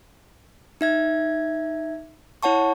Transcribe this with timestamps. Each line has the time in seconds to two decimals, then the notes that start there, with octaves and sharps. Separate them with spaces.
0.81 D#4 E5 G#6
2.43 E4 C#5 F#5 A5 C#6